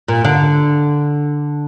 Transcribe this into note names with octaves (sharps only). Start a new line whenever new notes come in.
A#2
D3